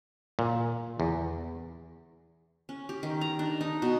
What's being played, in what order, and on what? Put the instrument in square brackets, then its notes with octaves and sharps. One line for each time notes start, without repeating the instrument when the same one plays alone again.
[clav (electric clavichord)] A#2
E2
[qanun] C#4
G4
D#3
A#5
D4
D#4
B2